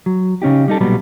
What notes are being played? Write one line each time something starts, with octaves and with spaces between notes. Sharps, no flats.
F#3
C#3 C#4 D#4 G4
G3 D#4 A4
B1 A#2 F#3 G3 B3 B5